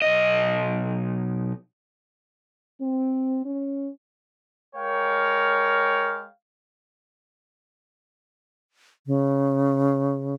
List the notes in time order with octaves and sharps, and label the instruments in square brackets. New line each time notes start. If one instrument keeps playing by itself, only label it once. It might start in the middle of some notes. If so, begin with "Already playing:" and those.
[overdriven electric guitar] B1 D#5
[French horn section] C4
C#4
[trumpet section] G#3 A#4 C#5 F5 G5
[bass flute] C#3